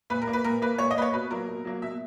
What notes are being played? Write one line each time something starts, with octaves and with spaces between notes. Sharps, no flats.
A#2 B4
A#4
A#3
B4
A#2 A#4
A#3 B4
A#2 C#5
D#5
A#3 B4
C#5
B2 B4
F#3 A#3 A#4
B2
F#3 A#3
B2 E5